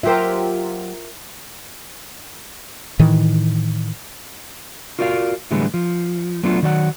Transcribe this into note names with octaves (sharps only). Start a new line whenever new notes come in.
F#3 F4 G4 A#4 C5 E5
A2 D#3 E3
F4 F#4 A#4 D5 D#5 F5
A2 D3 E3 G3 G#3 B3
F3
F#3 A3 B3 D4 F4
D#3 F#3 D5 D#5 F#5